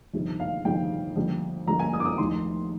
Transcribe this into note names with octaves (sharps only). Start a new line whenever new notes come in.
G1 F2 C3 D#3
F5
G1 F2 C3 D#3 G5
F2 D3 G3 A#3
F2 D3 G3 A#3 A#5
G#5
D#6
D6
D#6
F1 D#2 D#3 C6